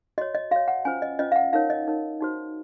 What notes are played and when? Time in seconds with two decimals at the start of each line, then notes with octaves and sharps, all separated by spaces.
0.18 F#4 C#5 D#5
0.35 D#5
0.51 F#4 C#5 F5
0.68 F#5
0.85 C#4 F4 C5 G#5
1.02 D#5
1.19 C#4 F4 C5 D#5
1.32 F5
1.36 F#5
1.53 D#4 A#4 C#5 F5
1.70 D#5
1.87 D#4 A#4 C#5
2.21 D#4 F#4 C5